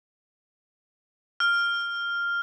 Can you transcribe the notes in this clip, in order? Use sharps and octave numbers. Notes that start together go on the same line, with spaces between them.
F6